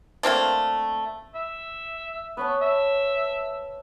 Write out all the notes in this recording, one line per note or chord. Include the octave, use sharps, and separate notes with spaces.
A3 A#3 C4 D4
E5
B3 B4 C#5 A5
E5